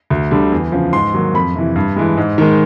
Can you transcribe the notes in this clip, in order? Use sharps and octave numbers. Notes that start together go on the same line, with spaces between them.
D2
D3 G3
E2
C#3 F3
G#2 C6
D#3 F#3 A#3
F2 B5
C3 E3
G2
E3 G#3
G#2
D#3 G#3